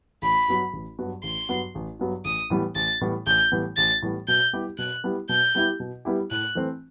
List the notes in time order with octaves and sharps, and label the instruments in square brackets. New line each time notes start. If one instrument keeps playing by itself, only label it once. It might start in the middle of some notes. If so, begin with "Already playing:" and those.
[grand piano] A1 [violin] B5
[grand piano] G2 F#3 B3 F#4
A1
G2 F#3 B3 F#4
[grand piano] A1 [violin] C6
[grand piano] G2 F#3 B3 F#4
A1
G2 F#3 B3 F#4
[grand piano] A1 [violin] D#6
[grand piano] A2 E3 G3 B3
[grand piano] A1 [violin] A6
[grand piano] A2 E3 G3 B3
[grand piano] A1 [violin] G6
[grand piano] A2 E3 G3 B3
[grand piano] A1 [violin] A6
[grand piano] A2 E3 G3 B3
[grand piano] B2 [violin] G6
[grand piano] G3 B3 E4 G4
[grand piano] B2 [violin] F#6
[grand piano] G3 B3 E4 G4
[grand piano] B2 [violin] G6
[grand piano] G3 B3 E4 G4
B2
G3 B3 E4 G4
[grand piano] A2 [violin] F#6
[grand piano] E3 A3 C4